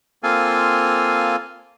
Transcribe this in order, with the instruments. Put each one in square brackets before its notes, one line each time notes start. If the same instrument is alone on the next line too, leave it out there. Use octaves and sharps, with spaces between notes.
[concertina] A#3 C4 F4 A4 F5 G#5